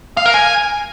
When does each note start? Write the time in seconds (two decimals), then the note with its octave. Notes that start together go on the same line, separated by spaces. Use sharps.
0.17 F5
0.26 A#4
0.34 G#5